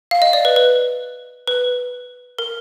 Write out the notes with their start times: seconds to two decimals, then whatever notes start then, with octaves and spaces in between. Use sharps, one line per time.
0.11 F5
0.22 D#5
0.33 D5
0.45 B4
0.56 B4
1.48 B4
2.39 A#4